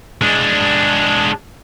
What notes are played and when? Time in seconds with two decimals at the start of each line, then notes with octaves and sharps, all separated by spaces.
0.22 G#3 D4